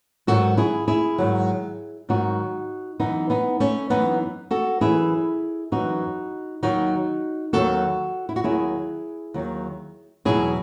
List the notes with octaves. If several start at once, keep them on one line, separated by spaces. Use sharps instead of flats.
G#2 D#3 F#3 F#4 A4
E4 G#4
E4 G#4
G#2 D#3 F#3
G#2 D#3 F#3 D#4 F#4
F#2 E3 B3 D#4
B3 D#4
A3 C#4
F#2 E3 B3 D#4
F#4 A4
F#2 E3 E4 G#4
F#2 E3 D#4 F#4
D#2 D#3 F#3 D#4 F#4
D#2 D#3 F#3 F#4 A4
E4
F#4
D#2 D#3 F#3 E4 G#4
D#2 D#3 F#3
E2 B2 F#3 E4 G#4